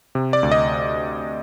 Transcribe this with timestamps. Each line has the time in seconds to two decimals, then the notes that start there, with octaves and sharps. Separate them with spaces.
0.15 C3
0.33 D5
0.43 D2
0.51 D#5